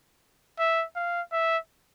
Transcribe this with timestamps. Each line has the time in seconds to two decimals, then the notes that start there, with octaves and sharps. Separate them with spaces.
0.59 E5
0.96 F5
1.32 E5